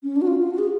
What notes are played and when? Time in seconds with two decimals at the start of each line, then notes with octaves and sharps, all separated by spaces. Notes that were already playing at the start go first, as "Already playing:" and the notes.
0.03 C#4
0.16 D4
0.22 F#4
0.27 F4
0.39 F4
0.50 F#4
0.58 G#4